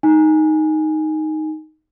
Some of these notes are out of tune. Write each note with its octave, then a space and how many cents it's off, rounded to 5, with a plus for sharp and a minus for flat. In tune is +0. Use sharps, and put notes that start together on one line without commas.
D#4 +0 G#5 +0